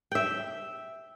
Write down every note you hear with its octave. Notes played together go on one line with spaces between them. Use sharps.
E5 G5